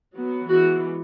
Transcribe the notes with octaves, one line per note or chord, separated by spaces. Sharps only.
F#3 B3
E3 G#3 B3 F#4